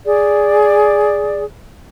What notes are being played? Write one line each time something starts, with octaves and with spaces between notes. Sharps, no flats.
G#4 D5